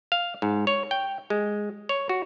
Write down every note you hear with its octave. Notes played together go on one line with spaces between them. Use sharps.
F5
G#2
C#5
G5
G#3
C#5
F#4